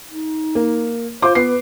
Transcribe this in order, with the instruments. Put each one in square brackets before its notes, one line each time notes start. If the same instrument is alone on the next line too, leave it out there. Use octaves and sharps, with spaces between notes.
[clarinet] D#4
[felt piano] A#3
[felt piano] F4 C6 D6 [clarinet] C5
[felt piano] B3 C7 [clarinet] B4